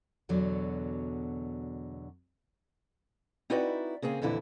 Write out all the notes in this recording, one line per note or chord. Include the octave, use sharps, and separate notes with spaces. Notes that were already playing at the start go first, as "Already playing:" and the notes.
E2 B2 D3 F#3
C4 D#4 E4 F#4 B4 D5
C#3 A#3 C4 G#4
F2 A#2 D3 E3 E4